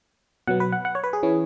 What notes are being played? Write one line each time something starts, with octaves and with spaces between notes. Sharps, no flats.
B2 F#3 B3 F#5
B4
F#5
F#5
C#5
B4
G#4
E3 C#4